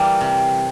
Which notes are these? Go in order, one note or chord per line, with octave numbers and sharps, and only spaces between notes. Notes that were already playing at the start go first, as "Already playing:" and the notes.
Already playing: E3 G3 A#3
C3